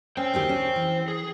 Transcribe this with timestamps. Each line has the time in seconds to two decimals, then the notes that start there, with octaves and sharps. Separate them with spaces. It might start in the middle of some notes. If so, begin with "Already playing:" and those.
0.17 C#4 C5 G5
0.34 D2 D#3 G4
0.49 C#4
0.76 E3
1.08 G#4